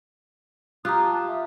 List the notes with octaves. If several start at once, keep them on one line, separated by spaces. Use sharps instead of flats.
F4 G4 A#5 D#6 F#6
A5
E5